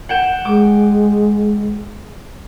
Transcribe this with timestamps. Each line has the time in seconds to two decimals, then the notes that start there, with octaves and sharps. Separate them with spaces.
0.09 F#5 G5 E7
0.45 G#3 D6